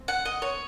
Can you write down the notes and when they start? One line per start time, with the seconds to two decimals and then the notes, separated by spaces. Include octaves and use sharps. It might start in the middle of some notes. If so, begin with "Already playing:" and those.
Already playing: C4
0.08 F#5
0.25 D#5
0.42 C#5